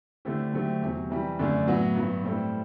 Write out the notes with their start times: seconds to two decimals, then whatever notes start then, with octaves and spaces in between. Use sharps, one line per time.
0.25 D3 A3 C4 E4 G4
0.53 D3 F#3 A3 C4 G4
0.82 E2 C3 F#3
1.10 C3 E3 G3
1.39 F#2 D3 A3 D4
1.67 A2 F#3 B3 F#4
1.95 G2 F#3 B3
2.23 A2 G3 C4 E4 A4